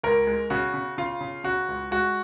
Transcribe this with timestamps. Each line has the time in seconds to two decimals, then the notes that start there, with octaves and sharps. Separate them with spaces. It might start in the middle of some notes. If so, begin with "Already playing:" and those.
0.03 C#2 A#4
0.27 G#3
0.50 C#3 F#4
0.74 C#3
0.98 C#3 F4
1.21 C#3
1.44 C#3 F#4
1.69 C#2
1.91 G#3 F#4